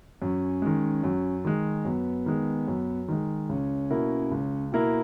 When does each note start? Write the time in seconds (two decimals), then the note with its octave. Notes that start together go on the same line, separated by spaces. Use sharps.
0.22 F#2 C#4
0.62 D#3 G#3
1.03 F#2
1.45 D#3 G#3
1.85 F#2 B3
2.26 D#3 G#3
2.67 F#2
3.08 D#3 G#3
3.49 C#2 C#4
3.90 B2 A#3 E4 A#4
4.31 C#2
4.72 B2 A#3 E4 A#4